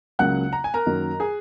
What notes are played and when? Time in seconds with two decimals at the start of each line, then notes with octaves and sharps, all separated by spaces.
0.19 C#2 C#3 F#3 A#3 F#5 F#6
0.53 A#5
0.64 G#5
0.74 A#4 A#5
0.86 F#2 D#3 F#3 A#3
1.20 G#4 G#5